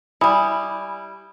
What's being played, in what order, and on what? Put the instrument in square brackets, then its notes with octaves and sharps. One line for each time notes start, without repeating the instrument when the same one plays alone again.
[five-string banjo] G3 E4 [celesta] G#5 B5 D#6